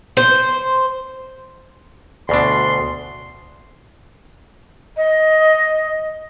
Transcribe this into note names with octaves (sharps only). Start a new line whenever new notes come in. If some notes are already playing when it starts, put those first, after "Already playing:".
C5
D2 B2 D4 C6
D#5